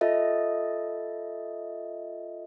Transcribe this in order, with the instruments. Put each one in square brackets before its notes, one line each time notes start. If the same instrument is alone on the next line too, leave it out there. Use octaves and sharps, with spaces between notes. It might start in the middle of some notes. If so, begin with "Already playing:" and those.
[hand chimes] F4 A4 D#5 E5